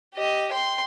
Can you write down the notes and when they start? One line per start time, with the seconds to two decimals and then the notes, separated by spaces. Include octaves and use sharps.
0.14 G4 D#5
0.51 G5 C6